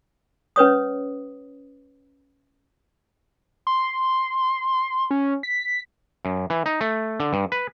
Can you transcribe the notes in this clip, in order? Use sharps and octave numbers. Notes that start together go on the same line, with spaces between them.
C#4 B4 C#5 D#6
C6
C#4
B6
F#2
E3
D#4
A3
D3
G2
B4